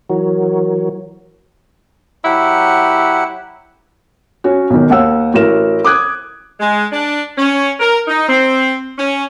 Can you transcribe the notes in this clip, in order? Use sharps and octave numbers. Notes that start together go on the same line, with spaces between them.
E3 F#3 F#4 A#4 C#5
F#3 E4 G4 F#5
C#4 F#4
B1 D#3
D#2 F5 F#5 E6
A1 F#4 A#4 E7
D6 D#6 F#6 G#6
G#3
D4
C#4
A#4
D#4
C4
C#4